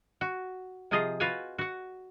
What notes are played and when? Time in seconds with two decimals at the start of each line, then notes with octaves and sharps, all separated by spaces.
0.21 F#4
0.91 C3 F3 F4 G#4 D#5 F5
1.20 F4 F#4 B4 F5 F#5 G#5
1.58 F#4 F#5